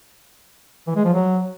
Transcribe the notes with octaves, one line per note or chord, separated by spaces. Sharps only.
E3
G#3
F3
F#3